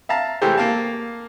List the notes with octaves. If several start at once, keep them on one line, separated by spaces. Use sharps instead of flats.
E5 F5 A5 A#5
C3 E3 G#3 A3 G4 C5
A#3 F5 A5